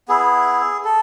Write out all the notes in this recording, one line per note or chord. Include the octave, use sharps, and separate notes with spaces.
B3 E4 G#4
A4